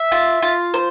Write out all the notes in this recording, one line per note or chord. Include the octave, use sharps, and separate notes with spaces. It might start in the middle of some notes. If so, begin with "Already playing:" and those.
Already playing: E5
F4
F4
C5